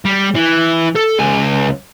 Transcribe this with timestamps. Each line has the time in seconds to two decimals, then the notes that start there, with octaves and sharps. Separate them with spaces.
0.05 G3
0.35 E3
0.95 A4
1.19 C#2 G#5